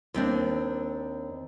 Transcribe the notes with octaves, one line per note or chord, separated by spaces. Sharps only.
D#2 C4 D4